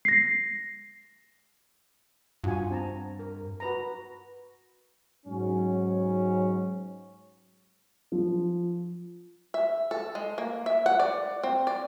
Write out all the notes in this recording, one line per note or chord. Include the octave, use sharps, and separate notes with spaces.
A#6 C7
G2 F4 F#4 G#5
C4 A5 A#5
A#4
F#4 B4 A#5
G#2 F#3 C#4
F3
E5
A4
G#3
A#3
E5
F#5
D5
C4
D5